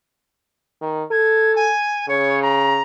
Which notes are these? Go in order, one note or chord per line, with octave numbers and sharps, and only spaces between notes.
D#3
A4 G#6
G#5
C#3 C#5
A#5